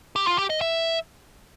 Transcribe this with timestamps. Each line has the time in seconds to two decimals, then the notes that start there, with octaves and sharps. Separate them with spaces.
0.16 G4
0.27 F4
0.38 G4
0.50 D#5
0.61 E5